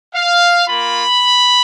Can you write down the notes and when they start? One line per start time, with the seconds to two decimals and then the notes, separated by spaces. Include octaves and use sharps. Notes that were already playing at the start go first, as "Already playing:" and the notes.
0.15 F5
0.67 A#3 F4 B5